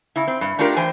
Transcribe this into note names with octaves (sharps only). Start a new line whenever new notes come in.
C#3 E4
C4
G2
A3 D4 F4 G4 A#4
E3 C5 G5 G#5